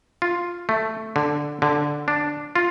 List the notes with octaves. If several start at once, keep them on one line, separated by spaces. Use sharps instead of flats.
F4
A3
D3
D3
D4
F4